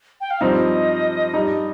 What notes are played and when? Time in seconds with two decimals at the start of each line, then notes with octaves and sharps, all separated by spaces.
0.21 G5
0.30 F5
0.41 G2 F3 C4 D#4 D#5
1.34 G2 G3 D#4